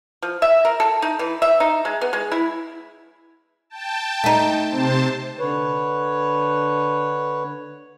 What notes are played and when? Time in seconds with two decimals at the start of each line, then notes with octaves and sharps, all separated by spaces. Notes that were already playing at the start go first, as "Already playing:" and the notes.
0.22 F3
0.42 E5
0.65 A#4
0.80 A4
1.02 D#4
1.19 E3
1.42 E5
1.60 D#4
1.85 G#3
2.01 B3
2.13 G#3
2.32 E4
3.70 G5 A5
4.24 A3 D#4
4.69 C3 C5 A5
5.39 D3 B4 C#5